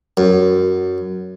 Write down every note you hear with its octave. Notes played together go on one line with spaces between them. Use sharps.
F#2